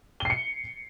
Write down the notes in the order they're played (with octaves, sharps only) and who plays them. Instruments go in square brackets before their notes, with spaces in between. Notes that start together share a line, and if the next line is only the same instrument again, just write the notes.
[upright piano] G7
C7
C#7